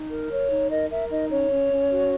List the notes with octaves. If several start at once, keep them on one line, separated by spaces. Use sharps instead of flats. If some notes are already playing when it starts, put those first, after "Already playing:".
Already playing: D#4
A#4
C#5
D#4
A#4 D#5
A#4 E5
D#4 D#5
C#4 C#5
C#4
C#4
F#4